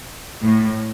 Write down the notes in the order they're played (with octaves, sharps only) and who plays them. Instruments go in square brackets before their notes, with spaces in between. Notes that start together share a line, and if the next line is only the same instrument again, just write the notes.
[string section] A2